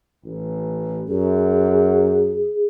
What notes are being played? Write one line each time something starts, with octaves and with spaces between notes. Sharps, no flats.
A1
F#2 G#4